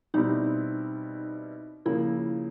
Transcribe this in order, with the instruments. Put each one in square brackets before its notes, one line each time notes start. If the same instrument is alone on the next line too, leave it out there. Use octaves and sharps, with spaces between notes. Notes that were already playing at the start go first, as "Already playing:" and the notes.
[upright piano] B2 G3 C4 E4 [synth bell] D#4
[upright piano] C#3 F3 A#3 [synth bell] E4